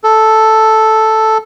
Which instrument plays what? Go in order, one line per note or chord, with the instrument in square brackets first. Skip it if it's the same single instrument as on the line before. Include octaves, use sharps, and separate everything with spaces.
[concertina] A4